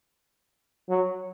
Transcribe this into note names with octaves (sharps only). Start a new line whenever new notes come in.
F#3